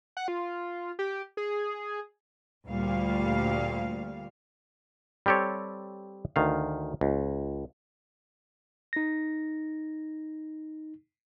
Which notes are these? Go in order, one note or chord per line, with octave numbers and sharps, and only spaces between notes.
F#5
F4
G4
G#4
D2 A#2 G3 F5
G3 C4 G4 A4 C#5
D2 D#3 F5
C#2
D#4 A#6